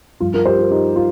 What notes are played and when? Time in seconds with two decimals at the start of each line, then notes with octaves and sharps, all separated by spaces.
0.20 G2 F3 F4
0.34 F4 A#4
0.46 G4 C5
0.58 F4 A#4
0.71 D#4 G4
0.96 F4